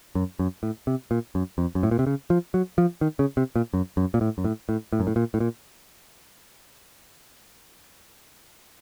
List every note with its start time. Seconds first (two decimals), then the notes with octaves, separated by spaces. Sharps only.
0.15 F#2
0.39 F#2
0.63 A2
0.87 C3
1.11 A#2
1.35 F#2
1.58 F2
1.75 F#2
1.83 A2
1.91 A#2
1.99 C3
2.07 C#3
2.30 F3
2.54 F#3
2.78 F3
3.01 D#3
3.19 C#3
3.37 C3
3.56 A#2
3.74 F#2
3.97 F#2
4.14 A#2
4.21 A2
4.38 F#2
4.44 A2
4.69 A2
4.93 A2
5.00 F#2
5.07 A2
5.16 A#2
5.34 A2
5.40 A#2